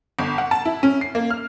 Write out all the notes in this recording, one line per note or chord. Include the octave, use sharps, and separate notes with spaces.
G1
F#5
A5
E4
C#4
C7
A#3
F6